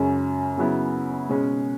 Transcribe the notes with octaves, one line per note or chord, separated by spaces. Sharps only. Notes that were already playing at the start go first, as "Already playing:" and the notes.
Already playing: F#2 C#3 G#3 C#4
C#3 F#3 B3 E4
B2 G#3 C#4